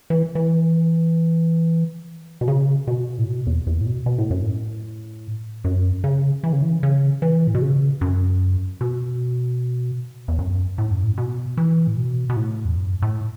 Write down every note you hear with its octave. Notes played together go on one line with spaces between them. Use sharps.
E3
E3
B2
C#3
B2
A2
B2
E2
E2
A2
B2
B2
A2
F#2
A2
F#2
C#3
E3
C#3
E3
C#3
E3
A2
B2
C#3
F#2
B2
E2
F#2
A2
F#2
A2
B2
E3
A2
B2
B2
A2
E2
F#2
A2